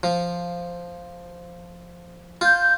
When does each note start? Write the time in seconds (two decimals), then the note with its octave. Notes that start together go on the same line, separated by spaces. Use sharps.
0.03 F3
2.41 F4 G6